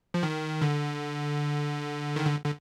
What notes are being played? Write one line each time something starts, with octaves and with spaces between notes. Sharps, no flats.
F3
D#3
D3
D#3
D3
D3